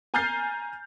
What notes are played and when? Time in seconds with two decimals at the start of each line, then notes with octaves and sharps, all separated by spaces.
0.14 G#5 A#5 F6 G6 A6 C7